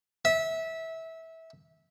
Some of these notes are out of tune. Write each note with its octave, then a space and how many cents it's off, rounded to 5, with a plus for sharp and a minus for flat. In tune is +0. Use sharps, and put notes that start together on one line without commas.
E5 -20